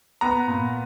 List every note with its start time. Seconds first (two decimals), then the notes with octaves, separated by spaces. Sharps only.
0.21 B3 A#5
0.47 A#2